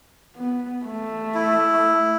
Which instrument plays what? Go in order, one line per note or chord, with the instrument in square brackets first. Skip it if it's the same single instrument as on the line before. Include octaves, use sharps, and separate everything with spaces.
[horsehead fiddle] B3
A3
[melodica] E4